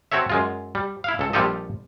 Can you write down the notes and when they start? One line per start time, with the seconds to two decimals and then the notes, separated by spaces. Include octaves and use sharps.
0.12 C4 F#4 A4 C#5 E5
0.30 F#2 G#3 F4
0.75 G3
1.04 E4 F5
1.19 C#2 A4
1.33 A#1 G3 F4 G4 A4 D#5